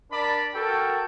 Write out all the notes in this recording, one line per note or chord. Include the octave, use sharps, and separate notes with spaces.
D4 A#4 D5 A5 B5
F#4 A4 A#4 G5